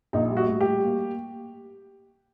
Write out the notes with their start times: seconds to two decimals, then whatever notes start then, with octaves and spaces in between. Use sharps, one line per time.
0.13 A#1 D#4
0.30 G3
0.37 F#4
0.48 A2
0.61 G4
0.66 G3
0.84 A#3